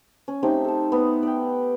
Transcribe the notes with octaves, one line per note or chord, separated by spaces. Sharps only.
C#4
A3 C4 D#4 G4
A4 A5
B3
D5 E5 G5